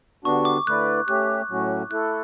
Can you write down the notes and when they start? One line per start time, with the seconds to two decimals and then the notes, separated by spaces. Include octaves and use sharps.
0.24 D3 G3 B3 D4 F#4 C#6
0.45 D6
0.67 D3 A3 E4 B4 D5 F#6
1.08 A3 C#4 G4 F#6
1.50 A2 F#3 A3 C#4 F#4
1.91 A3 E4 A4 F#6